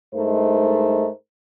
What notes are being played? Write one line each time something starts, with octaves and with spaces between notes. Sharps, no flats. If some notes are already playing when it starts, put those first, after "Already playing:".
G2 G#3 A3 D#4 A#4 C5